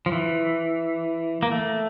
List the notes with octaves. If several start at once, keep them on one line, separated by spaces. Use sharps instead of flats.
F3
E3
A#3
A3